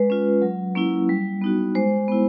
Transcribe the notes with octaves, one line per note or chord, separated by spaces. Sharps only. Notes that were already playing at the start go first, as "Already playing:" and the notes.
Already playing: G#3 B4
C#4 F4
F#3
A#3 C#4 E4
G3
B3 D#4 F#4
G#3 C5
B3 E4